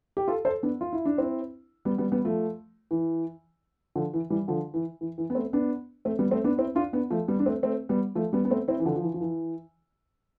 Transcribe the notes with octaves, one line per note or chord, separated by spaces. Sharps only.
G4
F4 A4
A4 C5
B3 D4
F4
E4
D4
C4 E4
G3 B3
G3 B3
G3 B3
F3 A3
E3
D3 F3
E3
E3 G3
D3 F3
E3
E3
E3
B3
A3 C4
B3 D4
A3 C4
G3 B3
A3 C4
B3 D4
C4 E4
D4 F4
B3 D4
F3 A3
G3 B3
D4
A3 C4
A3 C4
G3 B3
F3 A3
G3 B3
B3
A3 C4
C4 E4
E3
D3 F3
F3
E3
F3
E3